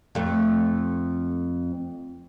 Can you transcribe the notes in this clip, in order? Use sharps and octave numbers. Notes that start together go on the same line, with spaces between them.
F2 A3